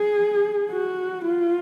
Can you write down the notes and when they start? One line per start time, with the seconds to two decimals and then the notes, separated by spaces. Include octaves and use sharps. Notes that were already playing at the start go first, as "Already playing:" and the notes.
Already playing: G#4
0.71 F#4
1.24 F4